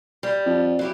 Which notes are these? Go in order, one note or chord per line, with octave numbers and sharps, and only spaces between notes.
G3
F2
F#3 E4 G4